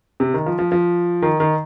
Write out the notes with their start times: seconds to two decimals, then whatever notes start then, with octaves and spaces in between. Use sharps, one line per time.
0.20 C3
0.34 D#3
0.46 F3
0.59 F3
0.72 F3
1.22 D#3
1.40 D#3